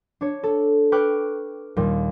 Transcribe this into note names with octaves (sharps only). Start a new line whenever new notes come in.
D4 C#5
A4
B4 G5 C#6 D6 F6 F#6
D#2 A#2 G3